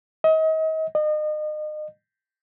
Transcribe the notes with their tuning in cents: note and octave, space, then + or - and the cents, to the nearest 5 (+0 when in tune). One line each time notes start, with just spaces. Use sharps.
D#5 +35
D#5 -35